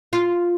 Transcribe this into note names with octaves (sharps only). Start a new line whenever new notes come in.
F4